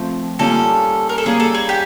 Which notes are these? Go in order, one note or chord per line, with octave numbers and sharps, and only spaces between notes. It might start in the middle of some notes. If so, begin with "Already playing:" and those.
Already playing: F3 A3 C4
G3 A#3 C#4 F4 A4
A#4
A4
G3 A#3 C#4 G#4
A4
G#4
G4